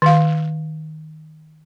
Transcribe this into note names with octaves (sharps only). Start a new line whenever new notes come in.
D#3 F5